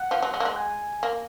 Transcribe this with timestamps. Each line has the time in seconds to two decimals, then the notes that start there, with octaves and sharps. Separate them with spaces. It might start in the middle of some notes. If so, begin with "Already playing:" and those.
Already playing: F#5
0.11 F3
0.22 F#3
0.34 G#3
0.40 A#3
0.45 G#3
0.56 G#5
1.03 A#3